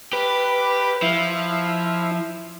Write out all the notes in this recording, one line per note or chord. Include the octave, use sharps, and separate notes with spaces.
G4 B4
F3 E4